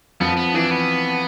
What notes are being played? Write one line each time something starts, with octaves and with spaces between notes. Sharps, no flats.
F2 F3 B3
B3
E3 D4
B3